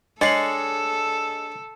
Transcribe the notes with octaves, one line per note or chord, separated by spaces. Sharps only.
G#3 D4 A4 C#5 D#5 A6 C7 F#7